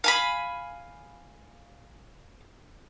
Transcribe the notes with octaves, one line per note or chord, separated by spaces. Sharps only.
F5 G#5 B5